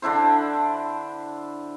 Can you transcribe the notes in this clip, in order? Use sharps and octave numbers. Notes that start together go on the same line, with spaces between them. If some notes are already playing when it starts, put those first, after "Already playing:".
D3 D4 E4 C5